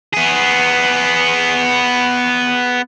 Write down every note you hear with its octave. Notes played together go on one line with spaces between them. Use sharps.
B3 G#4